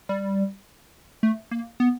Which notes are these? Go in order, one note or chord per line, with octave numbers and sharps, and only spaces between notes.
G3
A3
A#3
B3